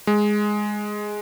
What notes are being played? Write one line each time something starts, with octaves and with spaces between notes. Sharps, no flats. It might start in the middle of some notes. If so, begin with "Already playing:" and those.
G#3